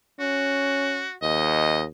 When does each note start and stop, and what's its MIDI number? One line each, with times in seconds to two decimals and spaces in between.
0.20 1.07 61
0.20 1.13 66
1.22 1.86 39
1.22 1.82 75